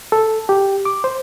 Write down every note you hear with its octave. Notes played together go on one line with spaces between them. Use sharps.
A4
G4
D6
C5